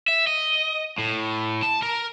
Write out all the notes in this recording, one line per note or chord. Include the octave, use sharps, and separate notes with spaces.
E5
D#5
A2
A5
A#4